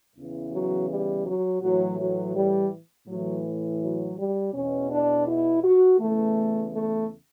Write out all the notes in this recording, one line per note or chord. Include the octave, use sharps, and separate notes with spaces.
E2 C#3 E3
F#3
G3
F#3
A2 E3 F#3
F#3
G3
A2 E3 F#3
F#3
G3
E2 B2 C#4
D4
E4
F#4
E2 C#3 E3 A3
A3